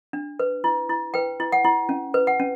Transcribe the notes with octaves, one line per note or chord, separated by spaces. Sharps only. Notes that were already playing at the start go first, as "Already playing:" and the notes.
D4
B4
E4
E4
B4 G5
E4
F#5
E4
C#4
B4
F#5
C#4